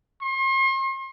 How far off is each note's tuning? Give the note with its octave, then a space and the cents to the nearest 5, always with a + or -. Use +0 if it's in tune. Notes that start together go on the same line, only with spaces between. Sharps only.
C6 +40